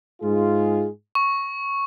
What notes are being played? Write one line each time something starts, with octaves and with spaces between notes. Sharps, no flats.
G#2 G#3 F4 G#4
C#6